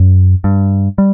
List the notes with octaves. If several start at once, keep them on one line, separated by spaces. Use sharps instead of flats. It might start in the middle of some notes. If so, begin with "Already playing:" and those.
Already playing: F#2
G2
G3